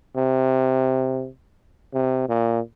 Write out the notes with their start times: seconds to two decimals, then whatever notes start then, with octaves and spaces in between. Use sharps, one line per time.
0.16 C3
1.94 C3
2.29 A#2